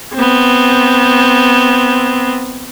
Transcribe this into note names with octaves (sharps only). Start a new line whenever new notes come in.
B3 C4